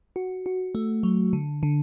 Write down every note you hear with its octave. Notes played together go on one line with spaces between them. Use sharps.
F#4
F#4
A3
F#3
D3
D3